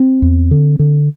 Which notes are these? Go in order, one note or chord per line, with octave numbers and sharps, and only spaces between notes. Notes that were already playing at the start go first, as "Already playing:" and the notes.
Already playing: C4
E2
D3
D3